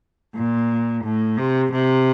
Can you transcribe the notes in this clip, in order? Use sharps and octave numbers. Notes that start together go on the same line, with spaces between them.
A#2
A2
C3
C3